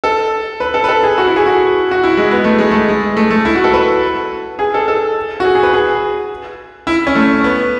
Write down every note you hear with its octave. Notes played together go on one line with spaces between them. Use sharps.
A4
B4
A4
B4
A4
G#4
F#4
E4
G#4
F#4
F#4
E4
G#3
B3
A3
G#3
A3
G#3
A3
A3
E4
F#4
A4
B4
G#4
A4
A4
F#4
G#4
G#4
B4
G#4
E4
C#4
A3
B3